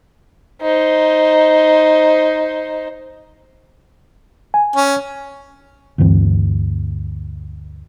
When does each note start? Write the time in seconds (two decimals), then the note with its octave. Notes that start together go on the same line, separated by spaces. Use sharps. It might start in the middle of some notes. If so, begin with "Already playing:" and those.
0.61 D#4 C5
4.54 G#5
4.76 C#4
5.98 D2 G2 E3 C4